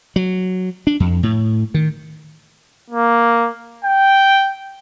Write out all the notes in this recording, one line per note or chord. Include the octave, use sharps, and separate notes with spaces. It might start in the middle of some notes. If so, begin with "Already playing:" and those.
F#3
D4
F2
A2
D#3
A#3
G5